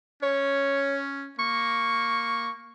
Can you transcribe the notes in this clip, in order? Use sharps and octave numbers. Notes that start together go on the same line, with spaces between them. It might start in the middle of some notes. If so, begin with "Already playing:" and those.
C#4 C#5
A#3 C#6